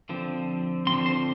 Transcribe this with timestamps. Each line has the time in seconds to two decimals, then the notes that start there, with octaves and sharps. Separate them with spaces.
0.09 D3 F3 C4
0.87 D3 F3 C4 C6
1.06 C5